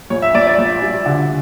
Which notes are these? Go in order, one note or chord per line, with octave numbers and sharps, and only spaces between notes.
A#1 C#5
E5
A#1 D5
D5
A#1
G3
D3